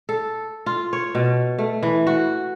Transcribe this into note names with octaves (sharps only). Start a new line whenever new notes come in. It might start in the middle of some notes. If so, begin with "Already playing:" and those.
A4
F4
C#5
B2
A3
E3
F#4